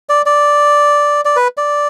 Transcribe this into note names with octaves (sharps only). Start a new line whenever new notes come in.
D5
D5
D5
B4
D5